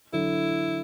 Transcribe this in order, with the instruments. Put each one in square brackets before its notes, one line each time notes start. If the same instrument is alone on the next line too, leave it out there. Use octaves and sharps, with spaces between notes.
[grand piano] D3 F#3 [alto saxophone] E4